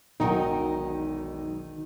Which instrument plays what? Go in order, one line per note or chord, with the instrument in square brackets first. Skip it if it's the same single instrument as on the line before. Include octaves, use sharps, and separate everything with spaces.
[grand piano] E1 B1 G5 [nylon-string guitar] D#3 F#4 [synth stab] D#4